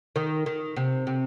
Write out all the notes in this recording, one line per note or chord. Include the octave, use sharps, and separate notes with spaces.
D#3
D#3
C3
C3